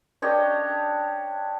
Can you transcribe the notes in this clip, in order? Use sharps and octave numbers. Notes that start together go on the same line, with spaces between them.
D4 G4 C#5 D#5